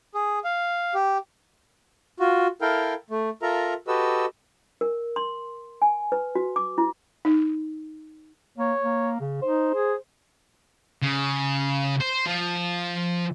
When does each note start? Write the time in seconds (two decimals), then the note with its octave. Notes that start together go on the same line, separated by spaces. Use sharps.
0.14 G#4
0.44 F5
0.94 G4
2.20 F4 F#4
2.61 E4 A4 A#4 F5 G5
3.10 A3
3.42 F4 A4 A#4 E5 A#5
3.88 F#4 G4 A4 B4 D#5 E6
4.81 A#4
5.16 C6
5.82 G#5
6.12 B4
6.35 F#4
6.56 D6
6.78 E4
7.25 D#4
8.58 A#3 C#5
8.82 A#3
9.21 C#3
9.42 D#4 C5
9.75 G#4
11.02 C#3
12.01 C5
12.26 F3